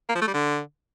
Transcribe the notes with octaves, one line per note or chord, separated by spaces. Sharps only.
A#3
F3
A3
G3
D3